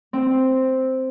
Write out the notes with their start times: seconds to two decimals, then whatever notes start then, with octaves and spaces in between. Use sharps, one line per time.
0.13 C4